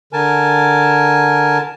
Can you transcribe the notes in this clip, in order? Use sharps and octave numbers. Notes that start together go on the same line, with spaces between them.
D3 A#4 G#5 A5